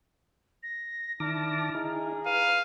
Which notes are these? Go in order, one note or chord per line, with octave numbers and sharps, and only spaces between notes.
A#6
D#3 D4 E4 A5 D6 F6 A#6
D#4 E4 G#4 A#5
B4 F5 D#7